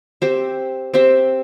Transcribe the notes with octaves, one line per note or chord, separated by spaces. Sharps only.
C4 G4 C5 E5
C4 G4 C5 E5